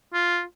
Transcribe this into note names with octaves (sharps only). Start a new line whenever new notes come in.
F4